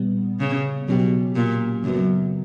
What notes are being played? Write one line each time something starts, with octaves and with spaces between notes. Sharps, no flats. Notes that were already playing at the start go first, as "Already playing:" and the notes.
Already playing: A#2 G3 B3
C#3
B2 F#3 C#4 G4
A#2
F#2 C#3 F#3 B3